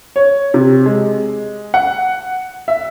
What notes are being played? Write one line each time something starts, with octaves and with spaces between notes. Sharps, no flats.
C#5
C3
G#3
F#5
E5